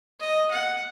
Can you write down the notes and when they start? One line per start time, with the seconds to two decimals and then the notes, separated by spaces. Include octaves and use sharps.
0.20 D#5
0.51 F#5